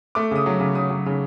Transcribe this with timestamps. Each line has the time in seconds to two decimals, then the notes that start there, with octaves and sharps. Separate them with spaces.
0.15 A3 D6
0.31 C#3 D#6
0.46 F#3
0.60 C#3
0.75 C#3 D#6
0.90 F#3
1.06 C#3